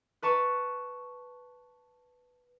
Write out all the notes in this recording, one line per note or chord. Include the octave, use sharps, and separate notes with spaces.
B4 A5 C#6